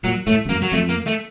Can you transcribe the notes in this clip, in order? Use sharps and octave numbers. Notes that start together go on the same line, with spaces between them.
A#2 F#3
A2 A3
F2
F#2 A#3
F#3
F2 A3
A#3
A3